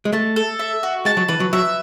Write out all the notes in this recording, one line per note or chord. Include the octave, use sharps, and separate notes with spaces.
G#3
A3 A5
A4
E5
F#4
G#3 A5
F#3
E3 B4
F#3
F#3 E5